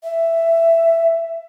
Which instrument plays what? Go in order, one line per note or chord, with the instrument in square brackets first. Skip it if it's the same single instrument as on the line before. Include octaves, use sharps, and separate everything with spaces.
[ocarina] E5